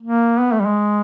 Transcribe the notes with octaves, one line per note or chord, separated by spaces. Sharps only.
A#3
B3
A3
G3
G#3